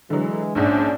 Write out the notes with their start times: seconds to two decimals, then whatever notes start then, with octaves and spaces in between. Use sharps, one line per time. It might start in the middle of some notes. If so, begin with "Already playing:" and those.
0.10 D3 E3 F#3 G#3
0.55 A#1 G#2 C#4 D4